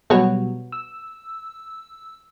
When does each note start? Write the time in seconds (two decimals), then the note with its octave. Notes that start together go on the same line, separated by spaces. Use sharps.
0.10 B2 F#3 G3 B3 F#4 C#5
0.72 E6